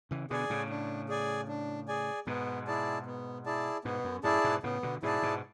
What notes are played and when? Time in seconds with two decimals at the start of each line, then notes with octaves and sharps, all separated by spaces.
0.11 C#3 E3
0.30 B2 D3 G#4 D5 G#5
0.50 A2 C#3
0.70 D4
1.09 G#4 D5 G#5
1.48 D4
1.88 G#4 D5 G#5
2.27 G#2 B2 B3
2.67 E4 G#4 D5 A5
3.06 B3
3.46 E4 G#4 D5 A5
3.85 G#2 B2 B3
4.04 F#2
4.24 F#2 A2 E4 G#4 D5 A5
4.44 G#2 B2
4.63 A2 C#3 B3
4.83 B2 D3
5.03 G#2 B2 E4 G#4 D5 A5
5.22 G#2 B2